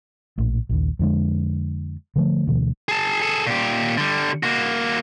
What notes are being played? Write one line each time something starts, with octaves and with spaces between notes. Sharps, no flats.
A#1 A2
A#1 D#2
F2 D3 G#3
D3 F3 A3
D2 B2 E3
G#4 A5
G#4 A4
A#2 G4
D3 G3
A#3 F#4